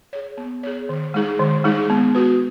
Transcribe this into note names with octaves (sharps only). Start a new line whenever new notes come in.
G#4 C#5
B3
G#4 C#5
D#3
G#3 D#4 G#4
D#3
G#3 D#4 G#4
B3
F#4 B4